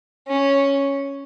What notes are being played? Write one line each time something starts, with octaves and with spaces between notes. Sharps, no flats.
C#4